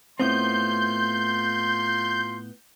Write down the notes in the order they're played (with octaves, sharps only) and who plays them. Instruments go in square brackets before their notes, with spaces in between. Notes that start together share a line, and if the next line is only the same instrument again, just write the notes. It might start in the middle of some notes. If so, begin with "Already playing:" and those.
[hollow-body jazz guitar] A2 B3 C4 [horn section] F4 C6 [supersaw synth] G6